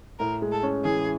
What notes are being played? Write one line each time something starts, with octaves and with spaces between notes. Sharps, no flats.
A2 A#4
G#3
A4
C#4
E3 G#4